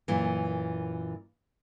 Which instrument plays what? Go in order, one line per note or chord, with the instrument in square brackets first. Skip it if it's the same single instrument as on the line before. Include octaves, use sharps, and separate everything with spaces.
[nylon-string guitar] F#2 A#2 E3